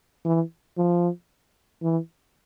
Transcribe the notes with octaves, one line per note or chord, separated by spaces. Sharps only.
E3
F3
E3